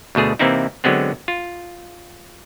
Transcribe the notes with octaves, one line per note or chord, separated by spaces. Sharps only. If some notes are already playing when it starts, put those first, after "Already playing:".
D2 B2 A3 G#4
C3 E3 A#3 C4 D#4 E4
D3 F#3 G#3 B3 C4
F4